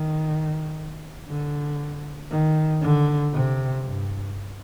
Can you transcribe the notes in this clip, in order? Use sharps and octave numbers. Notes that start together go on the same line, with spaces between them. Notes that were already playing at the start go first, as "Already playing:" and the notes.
Already playing: D#3
D3
D#3
D3
C3
G2